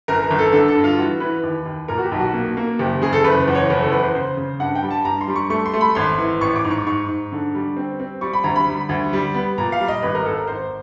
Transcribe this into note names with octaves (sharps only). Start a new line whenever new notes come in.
G1 A#4
A#4
G1
A4
D3 A4
A4
G2
F4
E3 F#4
E3 B4
D#2
D#2
A#2 A#4
F#4
G4
B1
F#4
A#3
A#3
F#1 G4
C#3 G#4
A4
F#1 B4
E2
C#5
F#1 B4
A4
E2 B4
C5
C#3 C5
C#3
G2 F#5
G5
G3
A5
G2 A#5
C6
G3
C#6
A3 C#6
C6
A3
B5
G#1 C6
E3
A1 C#6
D6
G#2
C#6
G#2 C#6
G#2
D3
G3
C4
C4
G3 C#6
B5
D2 A#5
B5
G3
D2
G3
B3
A#2 A#5
F5
G3
D#5
G#1 B4
A#4
G#1 A4
A#4
G#1 C5